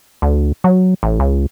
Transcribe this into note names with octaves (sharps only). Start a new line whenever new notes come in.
D2
F#3
A1
C#2